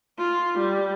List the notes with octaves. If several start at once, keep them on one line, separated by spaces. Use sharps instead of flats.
F4
G3